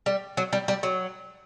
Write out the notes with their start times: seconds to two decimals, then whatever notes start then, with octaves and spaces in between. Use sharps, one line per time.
0.06 G3
0.37 F#3
0.53 G3
0.68 G3
0.83 F#3